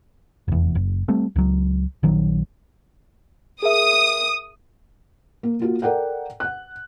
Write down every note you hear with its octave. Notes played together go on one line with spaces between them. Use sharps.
F1 E2
F#1
G3 A3 C4
C#2 F#3
A#1 D#3 F#3
G#4 A#4 E5 D#6
A#3
A#3 F4 F#4
A4 A#4 D5 F#5 G5
F#5 F#6